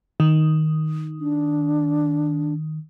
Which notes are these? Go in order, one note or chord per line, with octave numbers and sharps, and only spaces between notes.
D#3
D4